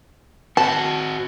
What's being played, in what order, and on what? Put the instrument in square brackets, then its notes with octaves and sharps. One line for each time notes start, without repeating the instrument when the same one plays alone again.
[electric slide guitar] C4 F#4 [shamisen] A5